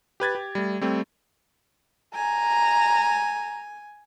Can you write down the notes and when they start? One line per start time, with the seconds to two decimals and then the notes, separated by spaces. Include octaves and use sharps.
0.20 G4 B4 G#6 A6
0.35 G4
0.55 G3 A3
0.81 G3 A3 C4
2.15 G#5 A#5